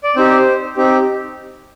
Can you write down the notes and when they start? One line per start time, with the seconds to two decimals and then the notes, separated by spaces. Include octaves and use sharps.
0.04 D5
0.16 C4 D#4 G4 C5
0.77 C4 D#4 G4